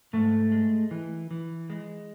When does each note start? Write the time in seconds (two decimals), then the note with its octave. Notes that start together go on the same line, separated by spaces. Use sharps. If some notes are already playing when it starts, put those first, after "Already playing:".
0.13 G#2 A3
0.52 G#3
0.91 E3
1.31 E3
1.70 G#3